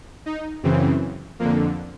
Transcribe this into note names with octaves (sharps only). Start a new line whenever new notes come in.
D#4
F#2 C#3 E3 C4
F2 D3 A#3